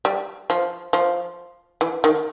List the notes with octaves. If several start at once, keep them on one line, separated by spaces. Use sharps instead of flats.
G3
F3
F3
E3
D#3